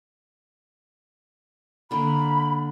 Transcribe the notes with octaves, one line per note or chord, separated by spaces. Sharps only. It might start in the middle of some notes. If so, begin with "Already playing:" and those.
D3 A#3 B5